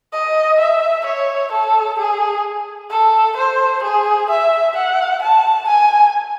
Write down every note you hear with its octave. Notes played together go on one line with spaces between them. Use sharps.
D#5
E5
C#5
A4
G#4
A4
C5
G#4
E5
F#5
A5
G#5